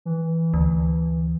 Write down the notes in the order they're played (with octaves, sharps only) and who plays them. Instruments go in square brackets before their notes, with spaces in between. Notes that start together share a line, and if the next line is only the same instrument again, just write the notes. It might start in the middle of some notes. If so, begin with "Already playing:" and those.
[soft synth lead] E3
[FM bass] D2